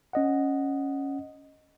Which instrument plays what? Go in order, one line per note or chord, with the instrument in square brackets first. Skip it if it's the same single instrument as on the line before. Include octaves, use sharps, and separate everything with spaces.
[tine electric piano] C#4 D#5 F#5